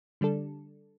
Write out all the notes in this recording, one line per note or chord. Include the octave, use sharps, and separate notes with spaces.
D3 G3 D4 A4